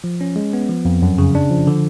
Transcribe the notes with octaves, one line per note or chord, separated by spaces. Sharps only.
F3
C#4
G#3
B3
F3
F2
F#2
C#3
D4
F3
D3